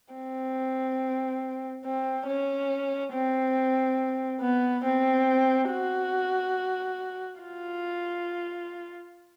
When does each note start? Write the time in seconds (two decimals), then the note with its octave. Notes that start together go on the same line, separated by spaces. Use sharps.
0.14 C4
1.85 C4
2.27 C#4
3.13 C4
4.41 B3
4.84 C4
5.70 F#4
7.40 F4